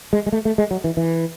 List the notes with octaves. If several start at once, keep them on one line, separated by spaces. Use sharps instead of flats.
G#3
G#3
A3
A3
G#3
F#3
E3
E3